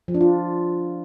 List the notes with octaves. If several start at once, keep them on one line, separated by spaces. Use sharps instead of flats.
F3
D4
F4